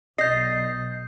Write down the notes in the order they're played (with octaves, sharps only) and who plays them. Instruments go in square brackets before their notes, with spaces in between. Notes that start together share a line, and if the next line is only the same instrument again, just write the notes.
[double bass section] B1 [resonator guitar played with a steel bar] D#5 [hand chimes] D#6 A6 [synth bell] G6 C7